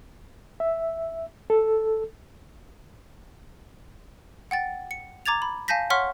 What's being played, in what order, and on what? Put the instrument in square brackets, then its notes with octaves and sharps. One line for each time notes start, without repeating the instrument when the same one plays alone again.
[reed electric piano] E5
A4
[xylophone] F#5 G5 A6
C#7
A#5 D6 G#6 A6 F7
B5
F5 G#5 A5 G6 A#6 B6
C#5 F#5 C6 C#6 F6 B6